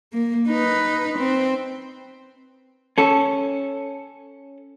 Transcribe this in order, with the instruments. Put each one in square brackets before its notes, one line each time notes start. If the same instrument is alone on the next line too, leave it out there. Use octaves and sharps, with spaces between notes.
[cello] A#3
D#4 B4
C4
[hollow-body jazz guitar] C#4 A4